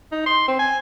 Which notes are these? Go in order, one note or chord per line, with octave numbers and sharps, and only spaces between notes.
D#4
C6
C4
G#5